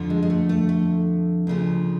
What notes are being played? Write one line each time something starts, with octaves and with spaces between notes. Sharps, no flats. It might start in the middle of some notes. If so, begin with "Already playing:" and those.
Already playing: F2 D3 F3
G#3
G#3
A3
A3
A3
D2 C#3 F3